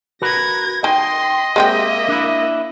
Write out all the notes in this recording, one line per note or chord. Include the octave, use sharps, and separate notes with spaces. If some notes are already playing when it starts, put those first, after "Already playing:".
F#4 A#4 B4 G#6 A#6
D#3 D#5 G5 C6
G#3 A#3 C4 G4 E5
D4 E4